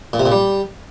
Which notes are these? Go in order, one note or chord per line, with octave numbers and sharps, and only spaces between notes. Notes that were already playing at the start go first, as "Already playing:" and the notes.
A#2
C3
A#2
G3